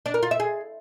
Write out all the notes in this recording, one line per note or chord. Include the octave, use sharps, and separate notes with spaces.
D4
A#4
F4
E5
G#4